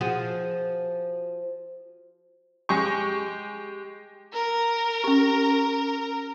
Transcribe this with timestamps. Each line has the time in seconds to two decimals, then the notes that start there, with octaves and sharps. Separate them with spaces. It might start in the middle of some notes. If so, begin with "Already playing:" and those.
0.01 F3 F#4 G#4
2.69 G#3 G4 C#6
4.33 A#4
5.04 C#4 G4